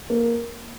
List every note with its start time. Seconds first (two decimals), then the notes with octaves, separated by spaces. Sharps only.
0.10 A#3